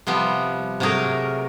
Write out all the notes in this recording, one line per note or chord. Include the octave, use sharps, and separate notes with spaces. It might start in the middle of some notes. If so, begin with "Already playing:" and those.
C3 F3 G3 B3
C3 F#3 A3 G#4 A#4